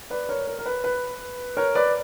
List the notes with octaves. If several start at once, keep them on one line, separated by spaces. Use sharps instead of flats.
B4 D5
A#4 C#5
A#4
A#4
B4
B4
A#4 C#5
B4 D5